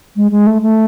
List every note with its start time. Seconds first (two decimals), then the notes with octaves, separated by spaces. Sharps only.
0.16 G#3
0.31 G#3
0.47 A3
0.62 A3